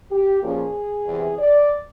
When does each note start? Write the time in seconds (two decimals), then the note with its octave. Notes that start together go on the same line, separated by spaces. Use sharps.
0.11 G4
0.42 A#2 F3 A#3 C#4 G#4
1.05 E2 C3 E3
1.38 D5